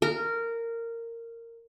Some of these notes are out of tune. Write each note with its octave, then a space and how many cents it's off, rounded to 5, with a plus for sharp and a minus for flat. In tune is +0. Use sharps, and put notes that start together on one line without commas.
A#4 -15